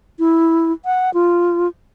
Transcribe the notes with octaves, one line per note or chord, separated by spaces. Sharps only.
E4
F#5
F4